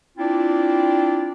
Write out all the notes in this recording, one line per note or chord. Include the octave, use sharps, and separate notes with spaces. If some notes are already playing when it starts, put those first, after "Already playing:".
C4 D4 E4 F4 D5